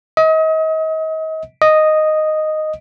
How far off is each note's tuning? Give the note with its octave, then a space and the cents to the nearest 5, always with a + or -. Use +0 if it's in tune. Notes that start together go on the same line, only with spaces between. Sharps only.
D#5 +35
D#5 -5